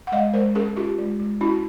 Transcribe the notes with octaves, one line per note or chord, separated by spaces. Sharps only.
F#5
G#3 D#5 F5
G#3 A#4 C5
C#4 G#4 A#4
C#4 F4 G4
G#3
G#3
C#4 E4 F#4